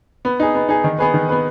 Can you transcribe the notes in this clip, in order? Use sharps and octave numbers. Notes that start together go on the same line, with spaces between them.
B3
D#4 G#4
B3
D#4 G#4
D#3
B3 G#4 B4
D#3
B3 G#4 B4